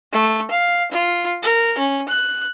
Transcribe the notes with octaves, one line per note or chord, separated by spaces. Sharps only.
A3
F5
F4
A#4
C#4
F#6